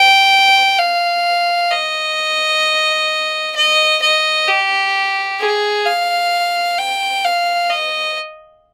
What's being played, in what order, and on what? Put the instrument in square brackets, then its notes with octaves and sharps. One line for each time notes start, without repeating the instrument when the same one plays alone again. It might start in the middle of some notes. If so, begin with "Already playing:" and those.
Already playing: [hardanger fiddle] G5
F5
D#5
D#5
D#5
G4
G#4
F5
G5
F5
D#5